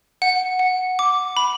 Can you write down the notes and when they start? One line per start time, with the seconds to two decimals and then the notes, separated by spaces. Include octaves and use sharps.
0.22 F#5
0.59 F#5
0.99 D6
1.37 B5